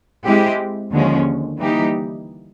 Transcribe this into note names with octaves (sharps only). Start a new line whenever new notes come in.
G#3 C4 E4 G4
D#2 D3 F3 G#3 C#4
E3 G3 A#3 D#4 G4